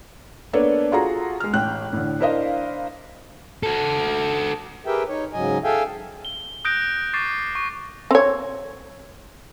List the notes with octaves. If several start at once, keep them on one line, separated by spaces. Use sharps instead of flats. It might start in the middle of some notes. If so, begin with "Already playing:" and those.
A#3 B3 D4 A4 B4 C#5
F4 F#4 G#4 A4 A#5
G#3 F6
A1 G5 F#6
A2 D3
D4 E4 A#4 C5 D#5 F5
F#4 A4
G4 G#4 A#4 B4 E5 G5
D#4 C#5
G#2 C#3 F#3 D#5 G#5
G#4 A4 E5 F5 G5 G#5
G7
D#6 F#6 G6 A#6 D7
C#6 D6 A6 C7
C#6
C4 C#5